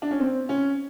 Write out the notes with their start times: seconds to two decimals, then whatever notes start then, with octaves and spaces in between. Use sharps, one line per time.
0.02 D4
0.11 C#4
0.20 C4
0.49 C#4